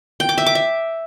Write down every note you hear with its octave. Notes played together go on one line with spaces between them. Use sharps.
G5
D6
E5
D6
E5